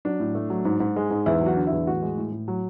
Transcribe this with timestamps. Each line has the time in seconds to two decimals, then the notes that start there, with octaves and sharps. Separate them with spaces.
0.05 F#3 D4
0.20 A2
0.35 A3
0.50 F#3
0.65 G#2
0.80 G#2
0.96 G#3
1.10 G#2
1.26 E2 E4
1.41 F#3 F#4
1.57 D3
1.67 E4
1.72 E2
1.87 A2 F#4
2.02 G#3
2.17 A2
2.32 A2
2.48 F#3